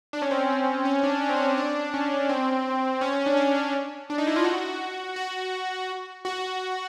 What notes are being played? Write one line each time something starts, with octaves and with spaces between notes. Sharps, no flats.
D4
C#4
C4
C#4
C#4
D4
C#4
C4
C#4
D4
C#4
C4
C#4
D4
C#4
D4
D4
D#4
E4
F4
F#4
F#4
F#4